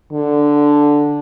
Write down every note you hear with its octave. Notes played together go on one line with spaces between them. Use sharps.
D3